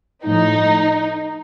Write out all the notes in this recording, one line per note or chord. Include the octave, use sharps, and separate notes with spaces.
A2 F3 D#4